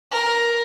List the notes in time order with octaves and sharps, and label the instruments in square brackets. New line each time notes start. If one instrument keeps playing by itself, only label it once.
[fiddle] A#4